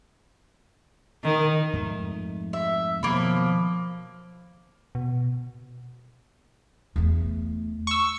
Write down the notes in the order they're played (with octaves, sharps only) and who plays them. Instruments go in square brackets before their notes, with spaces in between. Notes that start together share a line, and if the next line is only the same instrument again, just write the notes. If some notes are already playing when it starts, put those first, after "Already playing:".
[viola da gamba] D#3
[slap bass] F2 G#2 A3
[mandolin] E5
[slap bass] B2 D#3 F#3 [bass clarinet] F3 [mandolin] A#3 B5
[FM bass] B2
[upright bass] E2 A3
[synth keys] C#6 E6